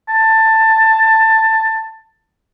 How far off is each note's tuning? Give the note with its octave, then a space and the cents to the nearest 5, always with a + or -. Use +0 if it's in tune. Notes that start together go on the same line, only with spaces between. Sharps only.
A5 +15